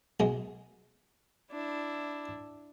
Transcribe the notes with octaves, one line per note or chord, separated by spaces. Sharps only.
B1 G#3
D4 E4